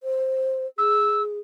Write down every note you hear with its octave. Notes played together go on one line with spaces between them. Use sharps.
C5
G#4 E6